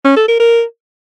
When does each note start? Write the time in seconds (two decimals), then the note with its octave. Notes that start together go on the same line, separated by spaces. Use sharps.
0.05 C#4
0.17 A4
0.28 A#4
0.40 A#4